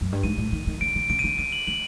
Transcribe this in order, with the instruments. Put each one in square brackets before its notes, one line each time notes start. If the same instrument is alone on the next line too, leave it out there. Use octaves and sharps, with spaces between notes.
[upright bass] F#2
G2
[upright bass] G#2 [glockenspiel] D#7
[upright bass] A2
D#3
D#3
[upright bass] D3 [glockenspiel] D7
[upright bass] D3
[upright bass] C#3 [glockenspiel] D7
[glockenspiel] D#7
[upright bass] D3
[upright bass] D3 [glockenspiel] D#7
[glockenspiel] F#7
[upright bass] D3 [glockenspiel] F#7